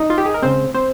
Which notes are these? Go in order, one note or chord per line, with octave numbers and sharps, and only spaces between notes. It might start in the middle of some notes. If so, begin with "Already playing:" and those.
Already playing: D#4 D#5
F4
G4
G#4
A#4
C#3 G#3 C4 C5
C4 C5